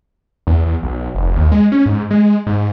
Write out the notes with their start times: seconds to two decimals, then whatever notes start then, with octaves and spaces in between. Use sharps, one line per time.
0.47 E2
0.66 E2
0.83 B1
1.15 F1
1.36 D#2
1.52 G#3
1.72 C#4
1.86 G#2
2.11 G#3
2.47 G#2